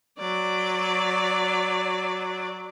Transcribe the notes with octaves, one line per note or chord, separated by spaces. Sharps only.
F#3 D5